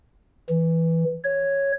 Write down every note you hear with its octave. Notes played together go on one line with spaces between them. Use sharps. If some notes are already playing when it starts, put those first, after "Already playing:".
E3
C#5